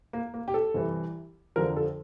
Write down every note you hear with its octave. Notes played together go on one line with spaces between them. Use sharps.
A#3
A#3
G4
A4
C2 C3 E3
F2 D3 F3 A#4
A4